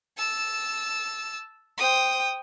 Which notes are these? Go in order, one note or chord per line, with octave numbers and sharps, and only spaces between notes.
A5 E6
C5 G5 D#6